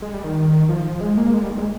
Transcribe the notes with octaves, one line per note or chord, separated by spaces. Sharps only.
G#3
G3
D#3
F3
G#3
A#3
G#3
G3
D#3
G#3